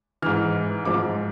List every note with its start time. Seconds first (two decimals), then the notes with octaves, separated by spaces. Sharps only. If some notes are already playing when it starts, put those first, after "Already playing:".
0.22 G#2 E3 F6
0.85 G#2 F3 D6